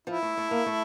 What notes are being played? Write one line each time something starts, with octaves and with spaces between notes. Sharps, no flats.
F3 E4
A3
A3
A#3
A3